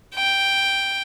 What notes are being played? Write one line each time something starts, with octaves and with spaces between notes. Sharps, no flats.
G5